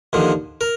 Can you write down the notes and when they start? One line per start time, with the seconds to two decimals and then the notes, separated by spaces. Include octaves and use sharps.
0.13 D#2 D3 F3
0.61 A#4